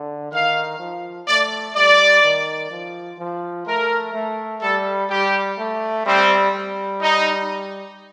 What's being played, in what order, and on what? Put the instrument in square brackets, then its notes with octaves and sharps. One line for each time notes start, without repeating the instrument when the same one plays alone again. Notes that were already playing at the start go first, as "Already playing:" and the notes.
Already playing: [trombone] D3
[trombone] D#3 [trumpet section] F5
[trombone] F3
[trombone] A3 [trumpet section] D5
[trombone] G3 [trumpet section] D5
[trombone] D#3
F3
F3
[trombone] A3 [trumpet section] A#4
[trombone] A3
[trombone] G3 [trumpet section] A4
[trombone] G3 [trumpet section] G4
[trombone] A3
[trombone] G3 [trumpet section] C4
[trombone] G3
[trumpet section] D#4